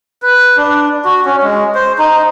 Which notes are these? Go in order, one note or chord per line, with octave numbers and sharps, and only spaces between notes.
B4
D4
F#4
C#4
G#3
C5
D#4